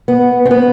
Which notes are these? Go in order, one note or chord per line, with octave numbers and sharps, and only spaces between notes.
B3
C4
B3